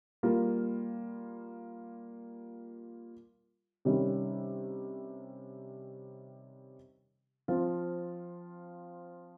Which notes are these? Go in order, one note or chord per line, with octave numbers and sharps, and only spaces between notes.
G3 A#3 F4
C3 D#3 G3 C#4
F3 C4 F4